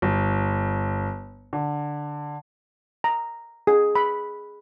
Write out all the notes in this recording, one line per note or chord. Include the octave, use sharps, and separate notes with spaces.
G1
D3
A#5
G#4
B5